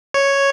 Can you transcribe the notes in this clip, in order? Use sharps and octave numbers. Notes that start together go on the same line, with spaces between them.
C#5